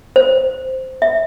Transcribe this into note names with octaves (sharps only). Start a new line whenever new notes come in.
C5
E5